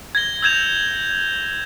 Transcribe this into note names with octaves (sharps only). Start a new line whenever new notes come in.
G#6 A#6 G7
E6 G6 G#6 E7 F7